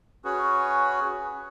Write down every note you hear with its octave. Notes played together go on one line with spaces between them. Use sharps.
C#4 F#4 G#4 B4